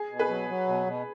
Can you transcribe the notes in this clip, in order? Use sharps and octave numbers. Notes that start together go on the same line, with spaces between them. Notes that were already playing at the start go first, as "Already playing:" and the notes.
Already playing: G#4
B2
G#4 B4
F#3
F#3
B2
B2